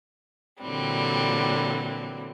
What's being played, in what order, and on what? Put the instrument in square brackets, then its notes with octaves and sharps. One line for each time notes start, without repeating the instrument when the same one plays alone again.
[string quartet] A#2 D3 E3 F#3 G3 C4